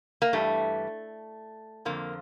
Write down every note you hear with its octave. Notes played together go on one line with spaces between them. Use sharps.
A#3
G2 E3 G3 A3
F2 D3 F3 A#3